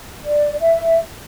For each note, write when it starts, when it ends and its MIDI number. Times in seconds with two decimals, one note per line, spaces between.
0.24 0.55 74
0.61 1.00 76